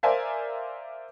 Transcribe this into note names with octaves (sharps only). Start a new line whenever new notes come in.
A#4 C5 D5 E5 F5 G#5